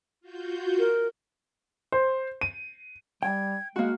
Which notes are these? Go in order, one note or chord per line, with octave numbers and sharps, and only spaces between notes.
F4 F#4 G6
A#4
C5
D#7
G3 G5 G#6
G#3 A#3 F#4 F#5